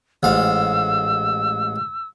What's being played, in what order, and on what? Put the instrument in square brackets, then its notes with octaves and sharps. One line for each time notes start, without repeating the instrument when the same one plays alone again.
[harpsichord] A1 G#2 F5 [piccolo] E6